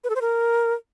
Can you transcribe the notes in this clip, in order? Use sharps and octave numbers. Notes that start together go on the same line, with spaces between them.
B4
A4
C5
A#4